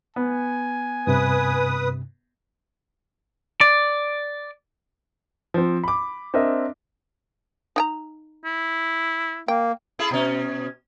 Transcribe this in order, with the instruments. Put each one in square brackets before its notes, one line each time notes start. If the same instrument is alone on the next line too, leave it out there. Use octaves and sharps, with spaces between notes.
[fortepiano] B3 [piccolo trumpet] G#5
[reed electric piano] G2 C3 [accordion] B4 D#6
[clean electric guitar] D5
[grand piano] F3 C4
B5 D6
C4 D4 A#4 D#5 E5
[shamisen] D#4 G5 A#5
[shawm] E4
[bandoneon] A#3 [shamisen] G5
[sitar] E4 G#4 A4
B2 C#4